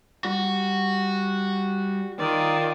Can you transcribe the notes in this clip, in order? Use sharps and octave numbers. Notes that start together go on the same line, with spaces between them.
G3 F#4
D#3 F4 D5